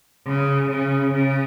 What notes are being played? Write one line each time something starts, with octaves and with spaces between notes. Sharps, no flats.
C#3
C#3
C#3